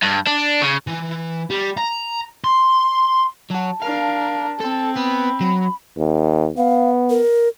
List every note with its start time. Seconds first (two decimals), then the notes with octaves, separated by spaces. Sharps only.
0.02 G2
0.27 D4
0.62 C#3
0.87 E3
1.50 G3
1.77 A#5
2.44 C6
3.50 F#3 F#4 A5
3.82 D4 A#4 F5
4.60 C4 A4
4.97 B3 B5
5.41 F#3
5.97 D#2
6.57 B3 F5
7.10 A#4